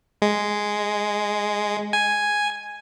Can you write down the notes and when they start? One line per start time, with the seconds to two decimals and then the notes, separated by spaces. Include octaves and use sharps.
0.22 G#3
1.93 G#5